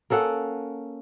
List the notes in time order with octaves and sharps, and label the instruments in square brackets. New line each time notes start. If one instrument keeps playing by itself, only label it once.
[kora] A#3 C#4 A4 F#5